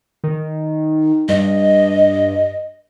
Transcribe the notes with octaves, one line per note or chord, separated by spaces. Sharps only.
D#3
G2 D#5